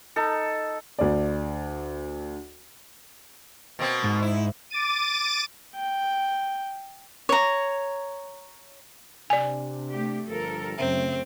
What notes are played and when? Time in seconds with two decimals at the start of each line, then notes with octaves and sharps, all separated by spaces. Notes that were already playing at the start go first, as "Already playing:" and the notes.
0.16 D#4 A4
0.99 D2 D5
3.79 B2 A#3 C4
4.04 G#2
4.22 E4
4.70 D6 A6 D#7
5.75 G5
7.29 C#5 A#5
9.30 C3 D4 D5 G#5
9.92 A3 G4
10.28 G1 G2 F3 A4 A#4
10.78 F#2 C#3 A3 C4 E5